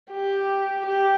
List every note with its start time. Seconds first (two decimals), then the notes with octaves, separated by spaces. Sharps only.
0.11 G4
0.86 G4